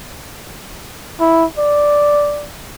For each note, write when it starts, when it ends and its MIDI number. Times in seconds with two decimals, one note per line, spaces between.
1.20 1.45 64
1.58 2.47 74